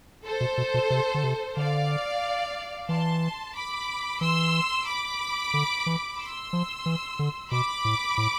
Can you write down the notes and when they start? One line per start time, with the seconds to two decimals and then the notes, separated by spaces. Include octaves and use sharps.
0.24 A4 C5
0.41 B2
0.58 B2
0.74 B2
0.90 C3
1.14 D3
1.24 C3
1.56 D3 D5 F5
2.89 E3 A5 C6
3.55 B5 D6
4.20 E3 C6 E6
4.87 B5 D6
5.54 D3
5.86 E3
6.19 C6 E6
6.53 F3
6.86 E3
7.19 D3
7.51 B2 B5 D6
7.85 A2
8.18 A2